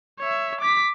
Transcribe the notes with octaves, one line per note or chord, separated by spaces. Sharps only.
C#5 E5
D6 B6